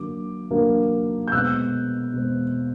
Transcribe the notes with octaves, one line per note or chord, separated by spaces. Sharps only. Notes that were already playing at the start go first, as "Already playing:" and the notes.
Already playing: D3 F#3 A#3 D6
D3 F#3 A#3
G6
B2 G#3 C4 E6 F#6
B2 G#3 C4